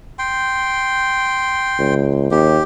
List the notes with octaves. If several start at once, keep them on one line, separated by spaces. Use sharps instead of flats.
G5 C6
C#2
D#2 G4